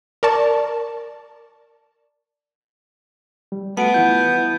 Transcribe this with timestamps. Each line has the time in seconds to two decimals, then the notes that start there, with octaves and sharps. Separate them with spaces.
0.23 A#4 D5 A5 C#6
3.52 G3
3.77 A3 B3 F#4 F#5 A5 D7
3.94 E3 E4 F4 G6
4.38 E4